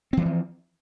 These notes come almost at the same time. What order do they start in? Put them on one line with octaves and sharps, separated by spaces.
C4 E3 G#3 F3